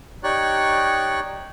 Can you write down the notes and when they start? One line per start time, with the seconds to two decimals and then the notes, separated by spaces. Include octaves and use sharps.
0.24 D#4 G4 C#5 D5 C#6 F#6